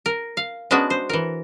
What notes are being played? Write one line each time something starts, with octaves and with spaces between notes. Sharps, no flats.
A#4
F5
G#3 B3 C#4 D4 F#4
C5
E3 A#4